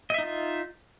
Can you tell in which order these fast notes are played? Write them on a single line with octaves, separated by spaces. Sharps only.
D#5 E5 D#4 F4